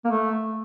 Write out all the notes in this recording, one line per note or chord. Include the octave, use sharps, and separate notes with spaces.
A#3
A3